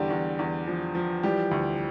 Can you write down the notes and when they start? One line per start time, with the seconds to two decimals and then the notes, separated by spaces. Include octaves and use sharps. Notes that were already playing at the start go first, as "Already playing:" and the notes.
Already playing: E2 D3 G3 G4
0.10 E2
0.39 E2
0.67 F3
0.95 F3
1.23 E3 G3 G4
1.51 D2